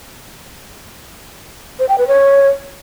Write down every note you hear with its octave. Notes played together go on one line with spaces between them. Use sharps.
C5
G5
B4
C#5